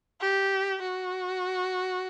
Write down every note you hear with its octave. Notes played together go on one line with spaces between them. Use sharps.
G4
F#4